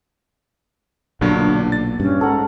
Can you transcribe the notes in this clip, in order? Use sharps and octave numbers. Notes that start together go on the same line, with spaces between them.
B1 G2 A#2 D3 F#3 D4
A6
G2 C#4
G#2 A4 F#5 A#5